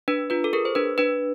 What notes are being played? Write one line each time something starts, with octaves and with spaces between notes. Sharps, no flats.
D4 B4
F4 B4
A4
G#4 A#4
C5
D4 B4
D4 B4